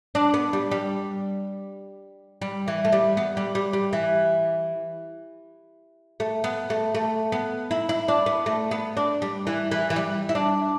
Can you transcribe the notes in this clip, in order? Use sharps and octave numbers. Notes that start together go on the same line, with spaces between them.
D4
B3
G3
G3
G3
E3
A3
G3
B3
G3
G3
G3
E3
A3
B3
A3
A3
B3
E4
E4
D4
B3
A3
B3
D4
G3
E3
E3
E3
G3
E4
D4